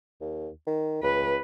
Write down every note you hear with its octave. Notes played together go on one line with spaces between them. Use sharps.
D#2
D#3
C#2 B4